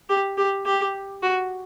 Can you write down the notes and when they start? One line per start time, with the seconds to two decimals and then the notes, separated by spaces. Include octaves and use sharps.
0.09 G4
0.37 G4
0.66 G4
1.23 F#4